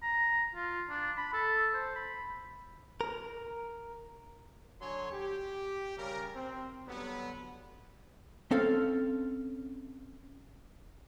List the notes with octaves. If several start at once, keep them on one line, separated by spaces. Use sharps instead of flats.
A#5
F4
D4
B5
A4
C5
B5
A#4
D3 F#3 D4 C#5 G#5 C6
G4
C#3 G3 A#4
C4
D3 F#3 G3 B3
C4 C#4 A4 F5